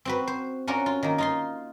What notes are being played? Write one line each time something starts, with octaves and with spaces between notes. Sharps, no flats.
C4 F#4 B4
C5
C#4 D4 F4 F#4 A#4 C#5
F4
D#3 A#3
D#4 F4 C6